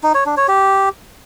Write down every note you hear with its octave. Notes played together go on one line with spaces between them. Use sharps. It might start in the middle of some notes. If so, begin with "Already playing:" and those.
D#4
C#5
D4
C#5
G4